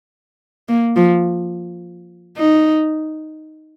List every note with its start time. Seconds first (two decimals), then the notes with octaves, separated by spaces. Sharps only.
0.69 A#3
0.96 F3
2.38 D#4